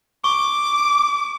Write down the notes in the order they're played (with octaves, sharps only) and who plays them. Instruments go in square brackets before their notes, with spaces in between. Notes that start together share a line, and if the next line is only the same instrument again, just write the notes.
[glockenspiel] C#6 [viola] D6